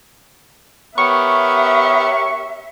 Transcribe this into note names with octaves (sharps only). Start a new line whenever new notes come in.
B3 G4 A#4 C#5 E5 C#6